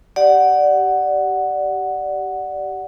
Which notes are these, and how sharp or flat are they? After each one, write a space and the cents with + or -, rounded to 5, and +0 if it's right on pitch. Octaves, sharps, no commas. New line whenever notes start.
G4 -15 D5 +0 F#5 +0